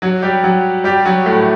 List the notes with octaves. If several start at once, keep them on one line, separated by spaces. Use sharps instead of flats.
F#3 F#4
G3 G4
F#3 F#4
G3 G4
F#3 F#4
A2 A3